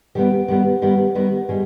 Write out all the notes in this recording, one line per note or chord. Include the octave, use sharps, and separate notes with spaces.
D#3 G3 B3 G4
D#3 G3 B3
D#3 G3 B3
D#3 G3 B3
D#3 G3 G#4